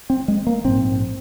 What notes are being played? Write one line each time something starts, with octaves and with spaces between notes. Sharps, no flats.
C4
G#3
A#3
A#1 G#2 C4